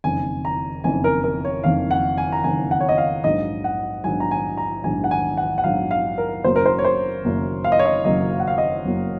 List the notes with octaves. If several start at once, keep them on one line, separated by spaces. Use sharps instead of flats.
F#1 F2 D#3 G#5
A#5
F#1 F2 D#3 G#5
A#4
A#4
C#5
F#1 F2 D#3 F5
F#5
G#5
A#5
F#1 F2 D#3 G#5
F#5
C#5
D#5
F5
A#1 G#2 F#3 D#5
F#5
A#1 G#2 F#3 G#5
A#5
G#5
A#5
A#1 G#2 F#3 G#5
F#5
G#5
F#5
F#5
A#1 G#2 F#3 F5
F5
A#4
F#1 F#2 C#3 F#3 A#3 C5
A#4
C5
C#5
C5
F#1 F#2 C#3 F#3 A#3
F5
D#5
C#5
D#5
F#1 F#2 C#3 F#3 A#3 D#5
F5
F#5
F5
D#5
F#1 F#2 C#3 F#3 A#3